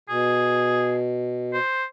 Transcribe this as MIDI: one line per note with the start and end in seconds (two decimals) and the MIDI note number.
0.09 1.58 47
0.09 0.97 68
1.54 1.84 72